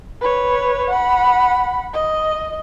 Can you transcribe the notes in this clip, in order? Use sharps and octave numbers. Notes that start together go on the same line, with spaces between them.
B4 C#5
F#5 B5
D#5